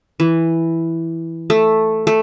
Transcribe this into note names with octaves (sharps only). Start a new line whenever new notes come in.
E3
A3
A3